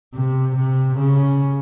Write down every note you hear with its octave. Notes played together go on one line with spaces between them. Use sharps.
C3
C3
C#3